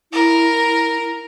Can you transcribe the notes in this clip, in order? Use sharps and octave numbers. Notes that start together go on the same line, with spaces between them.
E4 A#4